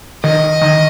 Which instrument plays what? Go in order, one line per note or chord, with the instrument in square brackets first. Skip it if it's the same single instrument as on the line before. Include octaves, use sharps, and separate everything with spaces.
[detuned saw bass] D#3 [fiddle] D#5
[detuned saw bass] D#3